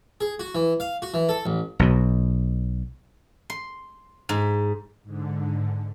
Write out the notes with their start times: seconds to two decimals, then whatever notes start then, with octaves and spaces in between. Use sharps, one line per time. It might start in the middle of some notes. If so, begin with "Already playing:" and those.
0.21 G#4
0.40 F#4
0.55 E3
0.80 F5
1.02 F#4
1.14 E3
1.29 A4
1.46 A1
1.79 B1 B2
3.50 C6
4.29 G#2
5.04 G#2 D3